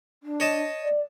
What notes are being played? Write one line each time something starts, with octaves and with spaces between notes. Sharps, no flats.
D4
C#5 D#5 A5
D5